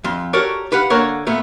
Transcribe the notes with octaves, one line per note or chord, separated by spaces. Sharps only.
F2 C6
F#4 G4 A4 A#4 C#5 D5
G4 B4 F5 F#5
D3 A#3 A#4 C#5 F5 F#5
A#2 A3 B3